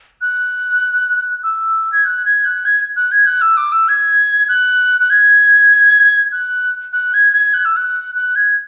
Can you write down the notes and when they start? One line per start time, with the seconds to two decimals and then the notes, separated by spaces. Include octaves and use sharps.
0.21 F#6
1.43 E6
1.92 G#6
2.05 F#6
2.26 G#6
2.45 F#6
2.65 G#6
2.96 F#6
3.12 G#6
3.26 F#6
3.42 E6
3.57 D6
3.72 E6
3.88 G#6
4.49 F#6
5.00 F#6
5.10 G#6
6.32 F#6
6.93 F#6
7.14 G#6
7.33 G#6
7.54 F#6
7.65 E6
7.76 F#6
8.15 F#6
8.36 G#6